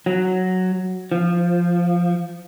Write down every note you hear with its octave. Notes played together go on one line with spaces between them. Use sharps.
F#3
F3